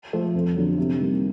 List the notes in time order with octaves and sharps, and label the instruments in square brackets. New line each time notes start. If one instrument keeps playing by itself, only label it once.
[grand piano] F3 A3
F2
D3 F#3
C3
D#3 G3 A#3